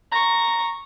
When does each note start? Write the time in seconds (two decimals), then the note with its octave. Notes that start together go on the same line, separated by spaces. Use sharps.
0.12 A#5 C#6 A#6